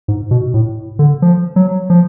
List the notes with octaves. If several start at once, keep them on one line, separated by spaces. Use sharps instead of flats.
G#2
B2
A2
D3
F3
F#3
F3